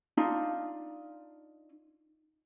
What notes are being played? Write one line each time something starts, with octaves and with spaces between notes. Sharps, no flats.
D4 D#4 F4